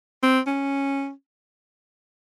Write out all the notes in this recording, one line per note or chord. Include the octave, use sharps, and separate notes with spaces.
C4
C#4